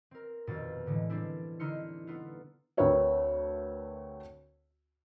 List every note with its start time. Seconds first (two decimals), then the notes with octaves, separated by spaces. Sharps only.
0.11 C4 A#4
0.47 D#1 F2 B2 F4 A6
0.86 A2 D3 E3 G#3
1.10 G3 A#3 C4 D4 E4
1.60 D3 D#4 E4 C6 F6 C#7
2.07 A3 B3 E4 F4
2.77 D2 C4 A#4 B4 C#5 E5